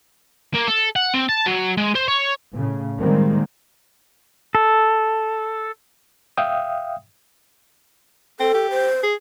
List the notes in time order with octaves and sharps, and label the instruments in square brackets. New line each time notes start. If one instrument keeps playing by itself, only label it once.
[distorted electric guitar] A#3
A4
F#5
C4
A5
F#3
G#3
C5
C#5
[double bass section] A2 C#3
D#3 G3 G#3 A#3 C4
[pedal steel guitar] A4
[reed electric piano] E5 F5 G5 D#6
[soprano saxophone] C4 [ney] A4
[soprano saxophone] G4
[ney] C5
[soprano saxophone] G#4